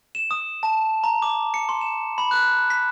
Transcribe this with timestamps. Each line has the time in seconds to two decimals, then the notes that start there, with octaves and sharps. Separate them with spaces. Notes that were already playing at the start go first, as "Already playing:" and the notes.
0.15 E7
0.31 D#6
0.63 A5
1.04 A#5
1.22 D6
1.54 C#7
1.69 C6
1.81 E7
2.18 B5
2.31 F#6
2.70 B6